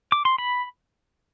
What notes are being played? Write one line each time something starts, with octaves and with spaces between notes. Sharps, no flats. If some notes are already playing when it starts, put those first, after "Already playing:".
D6
C6
B5